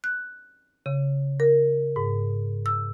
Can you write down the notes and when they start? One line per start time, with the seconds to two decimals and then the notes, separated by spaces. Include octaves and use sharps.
0.04 F#6
0.86 C#3
1.40 A#4
1.96 G#2
2.66 E6